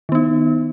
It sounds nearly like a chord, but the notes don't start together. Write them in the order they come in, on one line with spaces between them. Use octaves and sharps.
D#3 B3 D#4